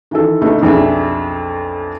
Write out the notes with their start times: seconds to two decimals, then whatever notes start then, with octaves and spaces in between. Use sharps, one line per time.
0.11 D#3 E3 A4
0.41 D2 D3 A3 D#4
0.62 B1 F2 D4 G#4 E5